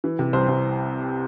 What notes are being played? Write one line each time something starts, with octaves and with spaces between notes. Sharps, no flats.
E3
C3
C2 C5
C2